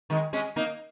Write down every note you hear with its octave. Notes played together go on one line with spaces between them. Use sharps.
D#3 G#3
G#3 C#4
A#3 D#4